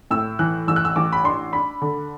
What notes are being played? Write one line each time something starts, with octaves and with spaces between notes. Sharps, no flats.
A2 E6
E3 F#6
A1 E6
F#6
E6
A1 D6
B5
D4 C6
D4 B5
D3